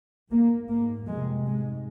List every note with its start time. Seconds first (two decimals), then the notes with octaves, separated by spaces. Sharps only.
0.31 G#2 A#3
0.69 G#2 A#3
1.07 F2 C3 G#3
1.46 G#2 G#3